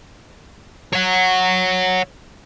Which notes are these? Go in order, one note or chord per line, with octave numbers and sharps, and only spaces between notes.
C#5 F#5